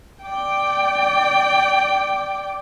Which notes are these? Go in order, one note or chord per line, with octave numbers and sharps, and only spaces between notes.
D5 G5